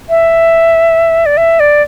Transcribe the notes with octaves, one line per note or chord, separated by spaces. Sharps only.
E5
D5
E5
D5